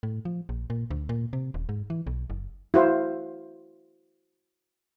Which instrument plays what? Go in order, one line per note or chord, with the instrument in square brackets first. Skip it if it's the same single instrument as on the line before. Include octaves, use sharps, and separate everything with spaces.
[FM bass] A2
F3
A#1
A#2
D2
A#2
C3
D#1
G#2
E3
B1
F#1
[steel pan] E4 F#4 C5 F5